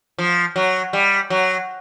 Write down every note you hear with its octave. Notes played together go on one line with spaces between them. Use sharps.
F3
F#3
G3
F#3